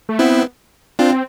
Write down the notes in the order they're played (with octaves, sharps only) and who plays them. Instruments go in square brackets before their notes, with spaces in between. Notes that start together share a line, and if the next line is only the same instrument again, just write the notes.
[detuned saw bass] A3
[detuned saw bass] B3 [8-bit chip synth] C4 E4
[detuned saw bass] C4 [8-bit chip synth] D4 F4